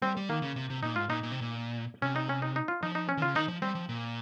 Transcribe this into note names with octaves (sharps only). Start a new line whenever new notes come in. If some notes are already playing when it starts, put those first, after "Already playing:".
G3 C4
G3
D#3 A#3
C#3
C3
C3
A#2 D#4
G#2 F4
A#2 D#4
A#2
C3
A#2
C3 C#4
D#4
C#4
D#4
D#4
F4
F3 D#4
D#4
C#4
D#3
C#3 F4
D#3 D#4
F3
G3 C4
F3
A#2